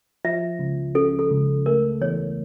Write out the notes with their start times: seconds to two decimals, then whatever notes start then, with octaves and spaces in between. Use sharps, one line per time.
0.24 F3 E5
0.59 C#2
0.95 C#3 A4
1.19 A4
1.30 C#2
1.66 A3 A#4
2.01 E2 C#5